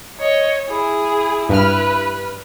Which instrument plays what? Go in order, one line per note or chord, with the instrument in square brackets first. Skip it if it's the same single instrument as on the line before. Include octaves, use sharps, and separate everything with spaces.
[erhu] C#5 [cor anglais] D#5
[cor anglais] E4 [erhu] G#4
[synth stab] G2 F6 [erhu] B4